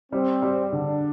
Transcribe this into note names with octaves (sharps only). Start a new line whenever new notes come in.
G3 C4
G3
D3 D4